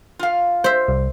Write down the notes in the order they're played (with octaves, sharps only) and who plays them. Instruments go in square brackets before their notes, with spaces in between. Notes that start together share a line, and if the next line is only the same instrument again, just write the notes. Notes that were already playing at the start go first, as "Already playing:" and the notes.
[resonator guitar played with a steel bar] F4 F5
[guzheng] C5 E5
[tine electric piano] C2